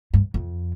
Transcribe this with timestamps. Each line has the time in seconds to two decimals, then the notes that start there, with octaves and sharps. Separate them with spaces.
0.14 G2
0.34 F2